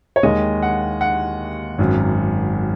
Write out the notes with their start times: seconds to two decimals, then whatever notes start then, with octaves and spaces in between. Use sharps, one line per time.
0.16 C#5
0.23 D#2 D#3 G#3 D#5
0.62 F#5
1.01 F#5
1.79 G#1 F#2 F#3